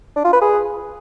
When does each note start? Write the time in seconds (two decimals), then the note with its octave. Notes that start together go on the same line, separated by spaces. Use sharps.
0.16 D4
0.25 F4
0.33 B4
0.42 G#4